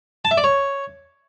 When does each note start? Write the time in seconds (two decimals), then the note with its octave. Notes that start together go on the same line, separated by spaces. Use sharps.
0.25 A5
0.31 E5
0.38 D5
0.44 C#5